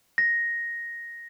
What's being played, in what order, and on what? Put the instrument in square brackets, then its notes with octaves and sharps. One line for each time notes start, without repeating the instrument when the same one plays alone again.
[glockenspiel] A#6